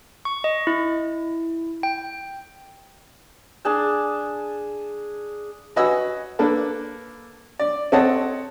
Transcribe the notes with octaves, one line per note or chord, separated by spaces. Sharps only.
C#6
D#5
E4
G5
D4 G#4 A5
F#4 B4 D#5 G#5 E6
A#3 D4 A4 B4
D5
C4 A4 C#5 D#5 F#5 A5